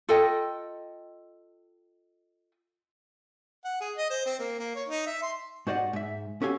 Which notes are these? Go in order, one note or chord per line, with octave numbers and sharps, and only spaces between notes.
F4 A4 D#5 G5
F#5
G#4
D#5
C5
C4
A#3
A#3
C#5
D#4
E5
C6
G#2 F#4 C5 D5 D#5 F#5
G#2 E5
C#4 F#4 G4 A4 F5 G#5